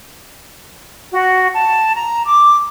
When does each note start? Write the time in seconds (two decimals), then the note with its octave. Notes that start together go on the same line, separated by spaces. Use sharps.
1.13 F#4
1.54 A5
1.95 A#5
2.26 D6